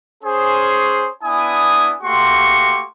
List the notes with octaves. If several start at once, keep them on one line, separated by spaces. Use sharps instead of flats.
C#4 G#4 C5
B3 D4 E4 G#5 D#6
A3 A#3 F#4 G4 C6 C#6